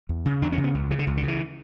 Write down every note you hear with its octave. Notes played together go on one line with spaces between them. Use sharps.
E2
C#3
E2 D4
C#4
C#3
B3
C#2
C#3 E3
D3
C#2
D3
C#3
E3